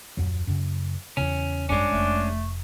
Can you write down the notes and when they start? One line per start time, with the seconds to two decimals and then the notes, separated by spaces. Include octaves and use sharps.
0.17 D1 F2 F#3
0.47 F#2 C#3
1.17 E2 C#3 C#4
1.69 G#1 F#2 G3 G#3 C#4 D4
1.91 F1 A3